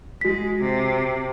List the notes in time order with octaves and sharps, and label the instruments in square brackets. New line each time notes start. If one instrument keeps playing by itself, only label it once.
[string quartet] G#3 [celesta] F#4 B6
[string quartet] C3